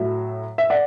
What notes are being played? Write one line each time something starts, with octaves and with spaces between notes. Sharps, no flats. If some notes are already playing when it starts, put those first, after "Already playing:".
Already playing: A2 F#3 E5
E5
D5 F#5